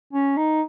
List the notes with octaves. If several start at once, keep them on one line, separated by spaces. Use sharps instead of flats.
C#4
D#4